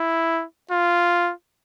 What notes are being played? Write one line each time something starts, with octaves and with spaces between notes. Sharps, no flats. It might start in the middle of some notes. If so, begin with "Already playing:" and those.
Already playing: E4
F4